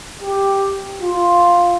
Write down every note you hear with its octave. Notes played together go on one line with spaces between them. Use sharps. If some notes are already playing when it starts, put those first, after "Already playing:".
G4
F4